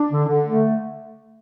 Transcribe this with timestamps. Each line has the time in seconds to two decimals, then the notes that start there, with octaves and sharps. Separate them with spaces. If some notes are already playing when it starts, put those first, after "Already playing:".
Already playing: D4
0.10 D3
0.28 D3
0.46 A3